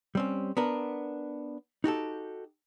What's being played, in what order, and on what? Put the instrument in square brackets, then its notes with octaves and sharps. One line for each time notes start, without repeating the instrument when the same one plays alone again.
[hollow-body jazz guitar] G3 C4 C#4
B3 D4 A#4
D#4 F#4 G4 A4